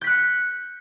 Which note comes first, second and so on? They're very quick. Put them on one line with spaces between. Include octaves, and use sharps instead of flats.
G6 B6 F#6 C#7